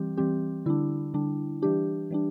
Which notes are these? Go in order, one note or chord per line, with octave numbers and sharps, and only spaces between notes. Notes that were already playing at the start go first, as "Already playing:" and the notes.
Already playing: E3 G3 C4 G4
E3 G3 C4 G4
D3 G3 D4 E4
D3 G3 D4
E3 G3 D4 G4
E3 G3 D4